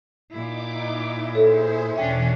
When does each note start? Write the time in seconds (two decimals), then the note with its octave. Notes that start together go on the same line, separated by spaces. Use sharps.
0.31 A#2 D#4 E4 D6
1.35 G#4 A4 C5 C#5
1.96 E2 B2 E3 C#4 D4 E5 G5